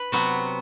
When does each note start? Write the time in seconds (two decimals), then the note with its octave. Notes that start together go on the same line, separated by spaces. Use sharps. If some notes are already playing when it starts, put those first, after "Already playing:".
Already playing: B4
0.12 C3 F#3 B3